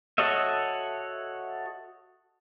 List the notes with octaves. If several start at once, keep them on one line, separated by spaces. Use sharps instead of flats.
F#4 A4 C#5 D#5 E5